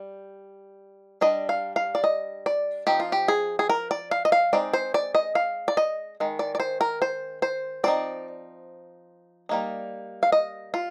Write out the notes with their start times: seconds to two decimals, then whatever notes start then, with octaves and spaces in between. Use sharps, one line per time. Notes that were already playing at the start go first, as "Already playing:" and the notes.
Already playing: G3
1.21 G3 D4 D#5
1.49 F5
1.76 F5
1.95 D5
2.04 D#5
2.46 D5
2.87 F3 C4 D#4 G4
3.00 F4
3.12 G4
3.28 G#4
3.59 G#4
3.69 A#4
3.91 D5
4.11 F5
4.25 D#5
4.32 F5
4.53 G#3 C4 D#4 D5
4.73 C5
4.94 D5
5.15 D#5
5.35 F5
5.68 D5
5.77 D#5
6.20 D#3 G#3
6.39 D5
6.55 D5
6.60 C5
6.81 A#4
7.02 C5
7.42 C5
7.84 F3 C4 D#4 D5
9.49 G3 A#3 D#4
10.23 F5
10.32 D#5
10.74 F4